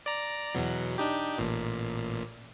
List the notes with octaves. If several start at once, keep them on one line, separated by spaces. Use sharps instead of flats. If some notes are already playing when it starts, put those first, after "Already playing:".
D5 A#5
E2 B2 F#3
D4 D#4 G4
A1 A#2